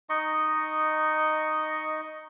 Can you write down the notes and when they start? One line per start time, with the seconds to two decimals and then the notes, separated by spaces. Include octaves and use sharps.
0.09 D#4 D#5 C#6